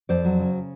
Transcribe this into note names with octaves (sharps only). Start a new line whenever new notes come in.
F2 C5 D5
F#3
C#3